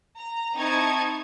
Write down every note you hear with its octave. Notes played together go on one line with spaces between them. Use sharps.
A#5
C4 D#4 E4 A5 C#6 G#6